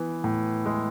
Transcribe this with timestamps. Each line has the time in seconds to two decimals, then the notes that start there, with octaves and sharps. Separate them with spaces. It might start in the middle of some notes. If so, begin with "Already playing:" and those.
Already playing: E3 B3
0.24 A2
0.66 G#3